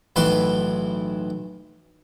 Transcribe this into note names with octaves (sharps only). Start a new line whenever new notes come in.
B1 A2 E3 B4 B5 C6